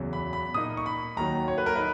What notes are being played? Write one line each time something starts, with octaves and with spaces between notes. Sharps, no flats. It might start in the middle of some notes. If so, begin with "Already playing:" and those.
Already playing: E2 C#3 F#3
B5
B5
A#2 A#3 D#4 D#6
C#6
B5
D#2 D#3 F#3 A#5
C#5
B4
A#4
D#4 B4